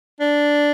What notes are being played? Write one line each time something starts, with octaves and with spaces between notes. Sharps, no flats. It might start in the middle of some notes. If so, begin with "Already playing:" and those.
D4